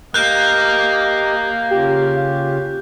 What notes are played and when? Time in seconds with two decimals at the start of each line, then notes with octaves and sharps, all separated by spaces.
0.14 A#3 G4 D#5 F5 F#6 G6
1.71 C#3 C#4 F4 G4